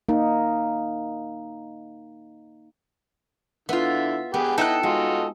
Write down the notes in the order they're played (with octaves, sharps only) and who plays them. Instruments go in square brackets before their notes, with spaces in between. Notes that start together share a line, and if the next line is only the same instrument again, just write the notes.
[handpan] A#3 D#4
[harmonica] D3 E4 [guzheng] B3 [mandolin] F4 E5
[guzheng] B3 [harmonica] G4 G#4 B4
[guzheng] D#4 [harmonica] E4 D#5 [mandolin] A4 G5 F#6
[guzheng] G#3 [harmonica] F4 F#4 D#5